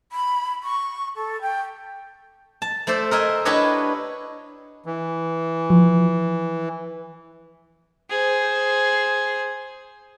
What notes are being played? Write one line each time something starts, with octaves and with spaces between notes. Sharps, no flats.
B5
C#6
A4
G5
A5
A3 C5 D5 E5
A#4 D#5 E5 G#5
D4 E4 G4 B4 C#5 D#5
E3
F3
G#4 C5